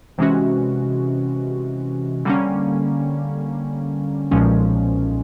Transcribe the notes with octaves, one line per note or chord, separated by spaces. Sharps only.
C3 E3 G#3 C#4 F#4
D3 G3 A#3 C#4
B1 A#2 F3 G#3 C#4